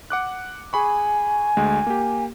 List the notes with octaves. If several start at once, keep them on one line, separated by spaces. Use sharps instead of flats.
F#5 D6 F#6
G#4 G#5 B5 C#6
D2 G#3
A#3 G4